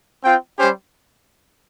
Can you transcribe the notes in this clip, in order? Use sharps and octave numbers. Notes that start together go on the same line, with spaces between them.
C4 F4 G5
G3 C#4 G4 C5